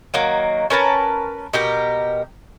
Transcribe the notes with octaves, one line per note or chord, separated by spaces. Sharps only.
D#3 F#3 A#3
C#4 A#4 B4 A5
B2 G4 A#4